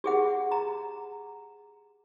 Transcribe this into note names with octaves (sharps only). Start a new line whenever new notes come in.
G4 G#4 F#5
A#5